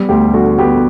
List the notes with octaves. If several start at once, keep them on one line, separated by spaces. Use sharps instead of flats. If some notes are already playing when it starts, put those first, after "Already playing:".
Already playing: G3 B3
D2 G4
D3 F#4
B3 G4